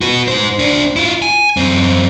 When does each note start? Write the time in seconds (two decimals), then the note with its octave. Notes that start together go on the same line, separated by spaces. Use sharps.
0.01 F#4 B4
0.28 D#4 C5
0.59 D4 C5
0.96 E4 F4
1.22 G#5
1.57 F#2 C4